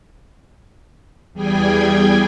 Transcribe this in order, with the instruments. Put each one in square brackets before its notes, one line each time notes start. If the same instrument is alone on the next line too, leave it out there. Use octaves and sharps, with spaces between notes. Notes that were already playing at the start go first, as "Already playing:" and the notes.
[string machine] E2 G3 G#4 G5 G#5